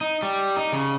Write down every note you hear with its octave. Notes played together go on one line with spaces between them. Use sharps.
D#4
G3
D#4
C#3